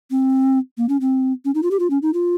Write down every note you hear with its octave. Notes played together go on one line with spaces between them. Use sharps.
C4
A#3
C#4
C4
C#4
D#4
F4
G4
F4
C#4
D#4
F4